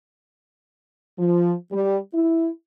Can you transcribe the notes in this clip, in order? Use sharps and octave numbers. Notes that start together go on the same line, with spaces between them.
F3
G3
E4